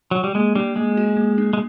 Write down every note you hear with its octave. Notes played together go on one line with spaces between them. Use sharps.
F#3
G3
G#3 A#3
G3 D4
G#3 A#3
F#4
A#3
D4
G#3